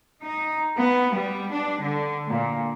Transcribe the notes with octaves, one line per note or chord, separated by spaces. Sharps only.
D#4
B3
G3
D4
D3
A#2